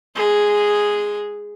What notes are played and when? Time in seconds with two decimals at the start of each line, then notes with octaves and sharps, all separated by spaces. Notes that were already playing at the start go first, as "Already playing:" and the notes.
0.15 G#3 G#4